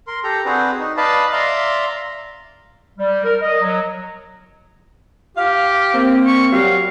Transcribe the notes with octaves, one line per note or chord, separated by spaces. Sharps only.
A#4 C6
G4 A4 A#5
C4 D4 F#4 G#4 B4 C5
D#4
B4 D5 D#5 F5 A5 B5
D5 E5 F5 A#5 C6
G3
A#4
D#5
F#3
G4 F5
A#3 C4
C#6
F#3 G3 F5